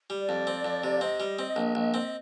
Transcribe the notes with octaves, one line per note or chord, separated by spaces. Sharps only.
G3
D5
F2
C4
F2
C3
F5
C4 D#5
G3
C4
A#1
A#1
C4